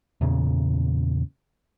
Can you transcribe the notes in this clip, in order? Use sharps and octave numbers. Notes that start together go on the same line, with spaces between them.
E2 A#2 C#3